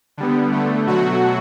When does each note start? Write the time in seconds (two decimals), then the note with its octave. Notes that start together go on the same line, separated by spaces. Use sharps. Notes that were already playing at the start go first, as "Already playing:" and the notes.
0.17 D3 G3 B3
0.52 D3 A3
0.87 B2 F#3 A3 F#4